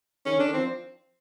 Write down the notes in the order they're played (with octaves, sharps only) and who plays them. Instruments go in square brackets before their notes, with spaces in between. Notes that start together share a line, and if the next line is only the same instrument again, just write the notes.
[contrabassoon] D#3 [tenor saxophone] C#4
[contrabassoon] D3
[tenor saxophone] D4
[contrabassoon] D#3
[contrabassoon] F3 [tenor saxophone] C4